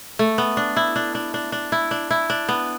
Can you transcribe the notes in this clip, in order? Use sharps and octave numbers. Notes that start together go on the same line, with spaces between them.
A3
B3
D4
E4
D4
D4
D4
D4
E4
D4
E4
D4
B3